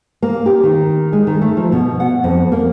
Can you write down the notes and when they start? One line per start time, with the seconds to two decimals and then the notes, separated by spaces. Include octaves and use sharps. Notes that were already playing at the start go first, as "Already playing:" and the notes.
0.22 A#3
0.46 G4
0.63 D#3
1.13 G#3
1.27 D#3
1.41 A3
1.57 F3
1.72 B2
2.00 F#5
2.24 F2
2.52 A#3